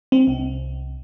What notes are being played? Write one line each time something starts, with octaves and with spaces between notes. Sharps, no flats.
C4
C2